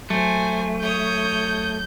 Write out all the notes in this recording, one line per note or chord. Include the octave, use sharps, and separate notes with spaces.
F#3 A3 C5 G#5
C#5 D#6 G6